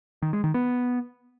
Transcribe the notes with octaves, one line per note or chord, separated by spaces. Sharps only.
D#3
G#3
D#3
B3